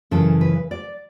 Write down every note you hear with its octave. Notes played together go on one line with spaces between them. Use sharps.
F#2 C#3 E3 A4
B4
D5